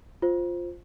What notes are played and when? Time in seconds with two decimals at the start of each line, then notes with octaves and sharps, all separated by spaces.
0.22 F4 C5